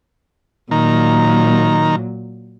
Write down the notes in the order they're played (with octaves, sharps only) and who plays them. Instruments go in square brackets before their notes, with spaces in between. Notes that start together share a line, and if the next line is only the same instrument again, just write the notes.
[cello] A#2 F#3 [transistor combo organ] D#3 A#5